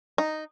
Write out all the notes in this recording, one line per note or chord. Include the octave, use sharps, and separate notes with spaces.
D#4